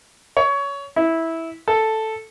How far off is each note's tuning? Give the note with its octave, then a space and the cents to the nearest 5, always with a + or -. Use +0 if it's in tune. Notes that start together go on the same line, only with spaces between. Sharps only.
C#5 +20
E4 -10
A4 +0